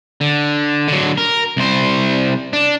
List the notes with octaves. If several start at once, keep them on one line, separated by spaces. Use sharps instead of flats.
D3
D3 F#3
A#4
C2 C5
D4